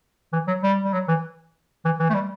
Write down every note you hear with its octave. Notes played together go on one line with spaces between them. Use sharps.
E3
F#3
G3
G3
F#3
E3
E3
E3
A3
G3